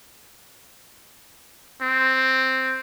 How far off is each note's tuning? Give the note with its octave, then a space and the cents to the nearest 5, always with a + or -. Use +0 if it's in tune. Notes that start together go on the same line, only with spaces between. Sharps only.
C4 +0